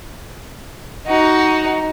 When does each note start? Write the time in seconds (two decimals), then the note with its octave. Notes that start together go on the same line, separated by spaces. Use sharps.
1.07 D#4 F#4